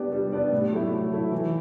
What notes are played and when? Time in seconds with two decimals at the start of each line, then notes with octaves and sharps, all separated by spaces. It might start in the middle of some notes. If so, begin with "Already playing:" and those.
Already playing: G3 B3 D4 G4 D5
0.12 G3
0.32 B3 D4 G4 D5
0.52 A2
0.72 F#3 A3 E4
0.92 A2
1.12 F#3 A3 E4
1.32 E3